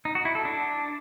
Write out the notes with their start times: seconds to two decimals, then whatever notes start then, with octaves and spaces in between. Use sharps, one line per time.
0.05 D#4
0.15 F#4
0.25 E4
0.35 A4
0.45 D4